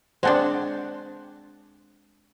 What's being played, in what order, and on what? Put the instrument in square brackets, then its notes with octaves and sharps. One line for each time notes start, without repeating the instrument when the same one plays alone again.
[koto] G#3 C4 D4 [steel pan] C5 F#5 A5